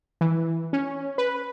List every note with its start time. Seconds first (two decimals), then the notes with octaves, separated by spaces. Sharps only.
0.21 E3
0.73 C#4
1.18 B4